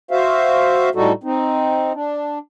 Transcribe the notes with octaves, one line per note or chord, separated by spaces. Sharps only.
F#4 C5 E5 F5
A2 G3 D#4 F#4 A4
C4 D#4
D4